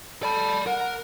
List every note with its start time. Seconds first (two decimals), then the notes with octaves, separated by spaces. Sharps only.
0.23 A4 D5 B5
0.66 A#4 F#5